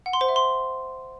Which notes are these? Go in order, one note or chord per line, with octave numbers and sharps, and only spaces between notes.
F#5
C6
C5
E5
C6